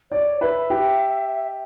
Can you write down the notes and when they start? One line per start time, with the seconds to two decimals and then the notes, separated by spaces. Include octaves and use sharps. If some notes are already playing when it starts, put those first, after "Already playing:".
0.11 C#5 D5
0.41 B4 E5
0.70 G4